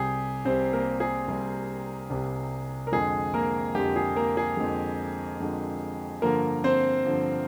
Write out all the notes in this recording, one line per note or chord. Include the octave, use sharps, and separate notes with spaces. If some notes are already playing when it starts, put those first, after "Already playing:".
Already playing: C2 C3 G3 G4 G#4
C2 C3 G3 C4 C5
A#3 A#4
G#4
C2 C3 G3
C2 C3 G3
A#4
F2 D3 G#3 G#4
A#3 A#4
F2 D3 G#3 G4
G#4
A#3 A#4
G#4
F2 D3 G#3
F2 D3 G#3
G2 D3 F3 A#3 A#4
C4 C5
G2 D3 F3